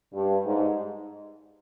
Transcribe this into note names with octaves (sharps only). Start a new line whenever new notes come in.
G2
G#2